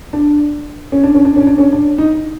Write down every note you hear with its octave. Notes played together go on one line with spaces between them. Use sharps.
D4
C#4
D4
C#4
D4
C#4
D4
C#4
D4
D#4